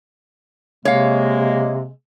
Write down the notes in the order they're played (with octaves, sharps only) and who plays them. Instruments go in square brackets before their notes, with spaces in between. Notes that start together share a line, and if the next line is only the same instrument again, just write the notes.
[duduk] C3 [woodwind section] G#3 A#3 [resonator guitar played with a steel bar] C#5 F5